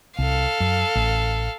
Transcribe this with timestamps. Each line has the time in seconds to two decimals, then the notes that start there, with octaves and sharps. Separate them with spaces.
0.19 C2 A4 F5
0.60 F#2
0.95 A1